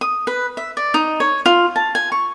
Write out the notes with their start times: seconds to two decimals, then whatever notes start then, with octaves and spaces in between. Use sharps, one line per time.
0.01 D#6
0.27 B4
0.57 E5
0.77 D5
0.94 D#4
1.20 C#5
1.46 F4
1.76 A5
1.95 G#5
2.12 C#6